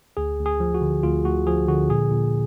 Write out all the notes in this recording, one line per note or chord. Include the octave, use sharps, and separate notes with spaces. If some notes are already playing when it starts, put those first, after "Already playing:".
D2 G#4
D2
G#4
F3
F#4
D3
D2 F4
D2 F#4
F3 G#4
D3 F#4
A#2 G#4
A#2